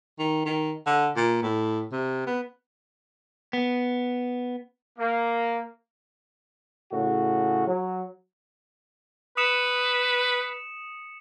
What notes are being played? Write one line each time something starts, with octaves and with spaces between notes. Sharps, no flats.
D#3
D#3
D3
A#2
A2
C3
B3
B3
A#3
A2 C#3 F#4
F#3
B4 D#6 C#7 E7